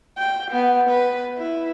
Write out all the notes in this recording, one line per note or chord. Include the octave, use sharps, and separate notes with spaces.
G5
B3
B4
E4